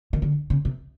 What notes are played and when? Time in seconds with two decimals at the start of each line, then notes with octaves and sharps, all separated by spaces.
0.13 D#3
0.22 D3
0.50 C#3
0.65 C3